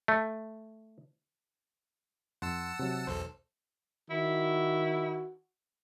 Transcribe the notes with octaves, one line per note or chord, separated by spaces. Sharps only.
A3
F2 F#5 A5 C6 E6
C3 F#3
B1 E2 A4 C5
D#3 E4 F#4